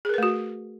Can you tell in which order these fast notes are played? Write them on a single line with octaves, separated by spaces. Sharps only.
G#4 A#4 B4 A3 F#4